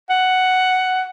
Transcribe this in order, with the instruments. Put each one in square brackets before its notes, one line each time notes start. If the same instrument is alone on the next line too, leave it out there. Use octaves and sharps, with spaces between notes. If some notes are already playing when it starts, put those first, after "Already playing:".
[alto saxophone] F#5